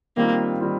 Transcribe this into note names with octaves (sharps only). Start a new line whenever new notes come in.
D#3 G3 A#3 C4 F4
D#3 G3 C4 F4